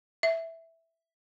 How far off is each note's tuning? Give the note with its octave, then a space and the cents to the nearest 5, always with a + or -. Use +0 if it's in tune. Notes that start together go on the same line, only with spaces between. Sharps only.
E5 -5